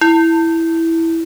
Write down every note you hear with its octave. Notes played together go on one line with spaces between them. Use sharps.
E4